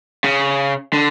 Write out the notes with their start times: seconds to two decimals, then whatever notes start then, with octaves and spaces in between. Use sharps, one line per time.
0.24 C#3
0.93 D3